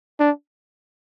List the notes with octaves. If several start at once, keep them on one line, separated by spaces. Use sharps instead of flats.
D4